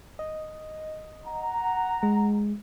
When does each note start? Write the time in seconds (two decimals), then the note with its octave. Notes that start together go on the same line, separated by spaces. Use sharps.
0.19 D#5
1.26 F#5 A#5
2.03 G#3